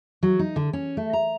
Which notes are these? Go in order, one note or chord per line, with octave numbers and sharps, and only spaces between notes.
F#3
D#4
D3
C#4
A3
A#5